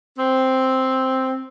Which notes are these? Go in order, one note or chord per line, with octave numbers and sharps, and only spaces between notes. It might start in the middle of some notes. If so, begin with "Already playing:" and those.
C4